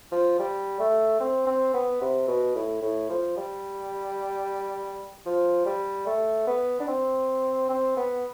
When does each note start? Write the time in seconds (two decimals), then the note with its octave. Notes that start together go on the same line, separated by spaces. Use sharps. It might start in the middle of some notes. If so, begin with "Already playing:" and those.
0.12 F3
0.39 G3
0.79 A3
1.20 C4
1.46 C4
1.74 B3
2.01 C3
2.28 B2
2.55 A2
2.82 A2
3.09 F3
3.37 G3
5.26 F3
5.66 G3
6.06 A3
6.47 B3
6.80 D4
6.87 C4
7.69 C4
7.97 B3